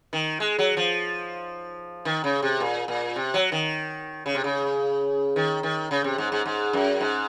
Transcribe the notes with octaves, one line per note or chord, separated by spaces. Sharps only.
D#3
G#3
F#3
F3
D#3
C#3
C3
A#2
A#2
C3
F#3
D#3
C#3
C3
C#3
D#3
D#3
C#3
C3
G#2
G#2
G#2
F#2
G#2